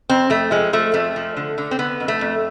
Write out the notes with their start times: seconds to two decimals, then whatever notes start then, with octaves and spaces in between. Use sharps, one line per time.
0.09 F2 C4
0.30 F2 A3
0.51 F3 G#3
0.73 F3 A3
0.94 F2 A3
1.16 F3
1.37 D3
1.58 D3
1.71 C4
1.79 D3 B3
2.00 F2
2.08 A3
2.21 F2